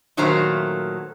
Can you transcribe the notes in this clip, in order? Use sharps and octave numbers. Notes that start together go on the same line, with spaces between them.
A#2 D#3 F#3 A3 C5 A#5